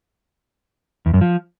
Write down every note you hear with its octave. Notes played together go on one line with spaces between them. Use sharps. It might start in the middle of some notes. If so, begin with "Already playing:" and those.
E2
F#2
F3